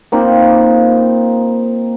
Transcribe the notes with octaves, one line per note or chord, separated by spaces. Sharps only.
A#3 C4 D#4 F4